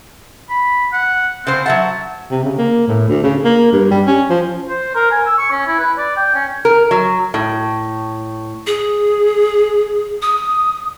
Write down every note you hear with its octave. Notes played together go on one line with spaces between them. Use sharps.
B5
F#5
C#3 C4 C5
F#3 E5 F#5 A5
C3
C#3
A#3
A2
D2
C#3
A#3
G2
G3
C#4
F3
C5
A#4
G#5
E6
C#6
C#4
E4
B4
D5
G5
C#4
A#4
F#3
A2
G#4
D#6